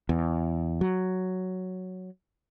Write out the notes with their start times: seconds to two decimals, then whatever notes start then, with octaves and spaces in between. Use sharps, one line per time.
0.09 E2
0.81 F#3